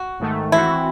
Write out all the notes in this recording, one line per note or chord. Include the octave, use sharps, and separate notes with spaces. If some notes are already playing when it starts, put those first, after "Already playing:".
Already playing: F#4
G#2 D#3 A3
E3 C4 E4 F#4